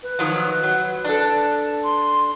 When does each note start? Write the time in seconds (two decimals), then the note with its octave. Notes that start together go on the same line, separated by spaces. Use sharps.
0.03 B4
0.19 D#3 F3 F#3
0.64 F#3
1.04 D4 A4
1.84 C6